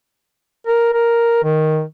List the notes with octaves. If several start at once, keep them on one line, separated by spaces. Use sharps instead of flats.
A#4
A#4
D#3